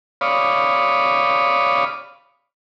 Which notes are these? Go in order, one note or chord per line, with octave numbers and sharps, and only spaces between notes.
C#5 D5 F5 B5 D#6